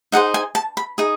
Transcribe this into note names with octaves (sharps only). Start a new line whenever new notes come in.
D#4 G#4 C5 F#5
G#5
A5
B5
D#4 G#4